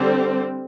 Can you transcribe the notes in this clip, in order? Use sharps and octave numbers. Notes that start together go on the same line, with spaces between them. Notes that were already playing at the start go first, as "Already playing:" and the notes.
Already playing: D3 G3 C4